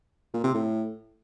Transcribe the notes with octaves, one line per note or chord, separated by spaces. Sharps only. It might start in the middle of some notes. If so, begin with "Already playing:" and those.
A#2
C3
A2